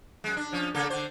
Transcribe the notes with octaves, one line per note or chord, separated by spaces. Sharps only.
F#2 G#3
D4
F3 C#4
C#3 A#3 A4
D3 C5